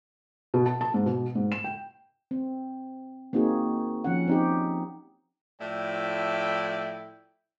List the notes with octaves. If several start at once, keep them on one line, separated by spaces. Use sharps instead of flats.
B2
A5
A5
G#2
B2
G#2
E7
G5
C4
A#3 C4 D#4 F#4 G#4
F3 C#4 F#5
C4 D#4 G4
A2 F3 E4 D5 G5